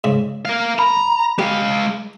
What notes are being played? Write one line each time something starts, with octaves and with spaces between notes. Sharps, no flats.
G#2 C#3
A#4 F5
A#5 B5
G#3 G4 F5